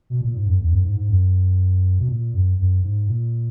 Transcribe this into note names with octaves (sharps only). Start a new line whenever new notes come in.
B2
A#2
G#2
F#2
E2
F#2
G#2
G#2
F#2
B2
A#2
F#2
F#2
G#2
A#2